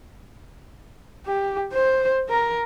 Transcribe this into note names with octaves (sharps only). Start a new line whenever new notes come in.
G4
C5
A#4